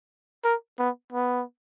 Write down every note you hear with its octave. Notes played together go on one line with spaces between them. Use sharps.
A#4
B3
B3